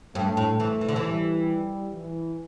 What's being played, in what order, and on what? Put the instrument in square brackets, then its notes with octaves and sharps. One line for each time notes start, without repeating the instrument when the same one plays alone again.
[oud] G2 [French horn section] A3
[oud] A2
E3
E3
D3
E3
[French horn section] G3
E3